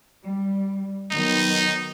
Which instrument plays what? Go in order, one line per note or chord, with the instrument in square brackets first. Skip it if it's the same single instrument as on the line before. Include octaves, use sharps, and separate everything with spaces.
[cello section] G3
[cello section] D#3 F#3 B3 [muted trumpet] D#4